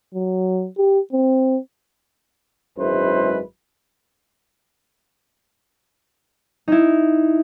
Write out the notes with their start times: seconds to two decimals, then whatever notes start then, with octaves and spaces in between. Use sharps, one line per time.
0.14 F#3
0.78 G4
1.13 C4
2.78 G#1 F#2 G#3 E4 B4 C5
6.68 D#4 E4